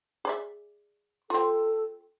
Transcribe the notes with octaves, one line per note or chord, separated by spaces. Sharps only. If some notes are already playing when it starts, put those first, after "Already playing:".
G#4 D5 E5
C4 F4 A4